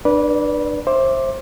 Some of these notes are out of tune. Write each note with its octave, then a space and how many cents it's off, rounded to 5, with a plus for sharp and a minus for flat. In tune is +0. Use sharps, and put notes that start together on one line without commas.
D4 +30 B4 -20 D5 -20
C5 +20 E5 +0 D6 +0